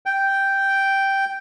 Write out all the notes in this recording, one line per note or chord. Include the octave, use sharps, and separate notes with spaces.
G5